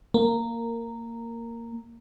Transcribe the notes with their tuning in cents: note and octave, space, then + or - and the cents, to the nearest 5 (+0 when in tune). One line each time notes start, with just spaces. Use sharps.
A#3 -10